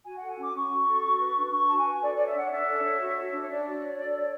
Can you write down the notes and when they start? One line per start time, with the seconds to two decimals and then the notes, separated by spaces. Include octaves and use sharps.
0.05 F#4 G#5
0.17 A4 F#5
0.29 G#5
0.38 C#4 D6
0.54 C#4 C#6
0.70 F#4
0.87 A4
1.03 F#4
1.19 B4
1.36 D4
1.52 D4 C#6
1.67 F#4 A5
1.76 G#5
1.85 B4
2.01 A4 D5
2.13 C#5 D5
2.26 E5
2.34 D4 F#5
2.50 D4 E5
2.66 A4
2.83 C#5
3.00 F#4
3.16 C#5
3.32 D4
3.38 C#5
3.48 D4 D5
3.64 F#4
3.81 C#5
3.97 A4
4.14 C#5